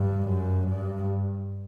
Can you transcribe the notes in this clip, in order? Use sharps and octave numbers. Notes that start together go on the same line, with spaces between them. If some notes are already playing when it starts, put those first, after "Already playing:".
Already playing: G2
F#2
G2